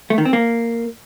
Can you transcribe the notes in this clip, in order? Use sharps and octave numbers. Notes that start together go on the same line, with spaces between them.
A3
D#3
C4
A#3